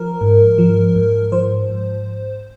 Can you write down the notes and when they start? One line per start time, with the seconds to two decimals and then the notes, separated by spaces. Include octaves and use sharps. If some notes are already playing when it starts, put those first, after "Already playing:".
Already playing: F3 A#4
0.21 G#2
0.58 F3
0.96 G#2
1.32 F3 C5
1.70 G#2